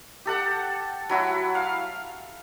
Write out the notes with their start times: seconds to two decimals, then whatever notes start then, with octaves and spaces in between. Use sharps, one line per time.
0.25 G4 A4 F#5
1.09 F#3 E4 F#4
1.55 F5